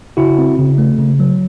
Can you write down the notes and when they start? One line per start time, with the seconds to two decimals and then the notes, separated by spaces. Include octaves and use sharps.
0.17 C#3 E4 F#4
0.38 C4
0.58 C#3
0.78 A3
0.98 C#3
1.20 F#3